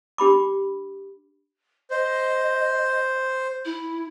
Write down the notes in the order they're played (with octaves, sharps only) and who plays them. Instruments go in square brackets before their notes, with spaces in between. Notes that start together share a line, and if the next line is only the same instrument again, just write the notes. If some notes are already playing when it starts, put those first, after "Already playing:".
[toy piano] D4 G4 B5 D6
[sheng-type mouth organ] C5 [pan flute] D#5
[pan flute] E4